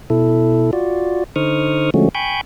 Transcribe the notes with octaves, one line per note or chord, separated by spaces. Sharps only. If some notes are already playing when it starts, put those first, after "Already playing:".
B2 E4 A4
F4 F#4 D5
D3 D#4 C5 C#6 D#6 F6
D3 F3 G#3 A3 C#4 F#4
G5 G#5 B5 C#6 G6